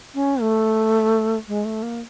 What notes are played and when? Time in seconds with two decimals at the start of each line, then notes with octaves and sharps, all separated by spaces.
0.15 C#4
0.41 A3
1.48 G#3
1.65 A3
1.83 A#3